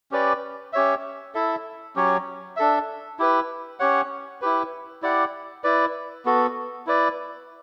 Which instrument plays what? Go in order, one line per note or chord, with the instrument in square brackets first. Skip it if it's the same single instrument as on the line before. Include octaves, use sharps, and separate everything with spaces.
[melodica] C#4 G4 B4 D5
C#4 G4 C#5 E5
E4 A4 E5
F#3 C#4 G4 C#5
D4 A4 E5
E4 G4 B4
C#4 G4 C#5 F#5
E4 G4 B4
E4 G4 D5 F#5
E4 B4 D5
B3 F#4 A4
E4 B4 D5